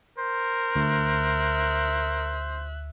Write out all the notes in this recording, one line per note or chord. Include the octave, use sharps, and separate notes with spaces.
A#4 C5
D2 E5 F#6